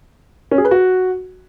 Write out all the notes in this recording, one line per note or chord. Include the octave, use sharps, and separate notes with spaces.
C#4
G#4
B4
F#4